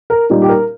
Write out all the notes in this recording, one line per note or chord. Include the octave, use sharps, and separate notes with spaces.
A#4
A#2 G3 D#4
G4
A#4